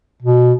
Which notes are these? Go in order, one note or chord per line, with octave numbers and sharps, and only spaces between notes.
B2